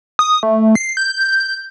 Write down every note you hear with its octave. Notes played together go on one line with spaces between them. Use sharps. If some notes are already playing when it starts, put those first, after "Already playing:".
D#6
A3
C7
G6